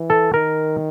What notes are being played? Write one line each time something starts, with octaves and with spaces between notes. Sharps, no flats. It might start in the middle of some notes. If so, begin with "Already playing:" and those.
Already playing: E3
A4
D#3 A#4